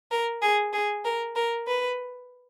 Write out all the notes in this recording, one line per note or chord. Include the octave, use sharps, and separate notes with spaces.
A#4
G#4
G#4
A#4
A#4
B4